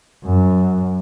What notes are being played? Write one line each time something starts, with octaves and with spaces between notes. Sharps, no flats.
F#2